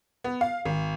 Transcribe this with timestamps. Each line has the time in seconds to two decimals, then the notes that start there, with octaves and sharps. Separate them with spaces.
0.24 B3
0.41 F5
0.65 G#1